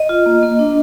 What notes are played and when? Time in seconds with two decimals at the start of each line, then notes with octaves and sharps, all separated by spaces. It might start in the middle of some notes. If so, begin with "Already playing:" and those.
Already playing: D#5
0.09 F4
0.26 A#3
0.43 A#3
0.59 D4